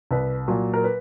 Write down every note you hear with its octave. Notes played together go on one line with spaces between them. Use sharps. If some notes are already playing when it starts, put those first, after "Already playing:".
C2 B4
A#2 F#3
A#4
B4